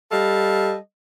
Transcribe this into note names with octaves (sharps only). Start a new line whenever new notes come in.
G3 A4 D#5 F5